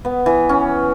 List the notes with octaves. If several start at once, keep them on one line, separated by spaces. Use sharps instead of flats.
B3
E3
C#4